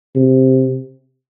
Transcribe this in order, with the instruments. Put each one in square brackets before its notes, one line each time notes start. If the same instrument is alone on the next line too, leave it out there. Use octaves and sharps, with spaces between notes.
[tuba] C3